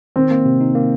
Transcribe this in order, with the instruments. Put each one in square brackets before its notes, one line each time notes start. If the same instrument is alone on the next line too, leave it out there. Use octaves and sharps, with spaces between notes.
[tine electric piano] D#3 [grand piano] C4
[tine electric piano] A#3
C3
D#4
A#3